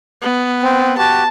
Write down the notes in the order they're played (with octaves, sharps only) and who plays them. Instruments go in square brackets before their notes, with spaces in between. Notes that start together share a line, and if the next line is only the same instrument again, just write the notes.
[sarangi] B3
[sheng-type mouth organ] C4
[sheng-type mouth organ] F#4 G4 [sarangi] A5